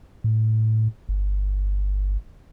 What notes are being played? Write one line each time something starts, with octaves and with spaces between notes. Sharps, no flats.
A2
G1